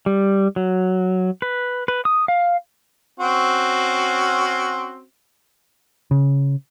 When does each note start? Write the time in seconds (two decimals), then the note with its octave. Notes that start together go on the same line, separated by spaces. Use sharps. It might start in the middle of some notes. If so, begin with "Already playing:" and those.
0.06 G3
0.56 F#3
1.42 B4
1.88 B4
2.05 D#6
2.28 F5
3.20 C4 C#4 F#4
6.11 C#3